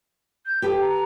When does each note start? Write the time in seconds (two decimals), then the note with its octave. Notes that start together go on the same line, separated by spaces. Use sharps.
0.46 G6
0.62 G4 A4 B4 G5
0.81 A#5